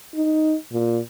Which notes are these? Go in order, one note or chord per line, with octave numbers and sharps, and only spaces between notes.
D#4
A#2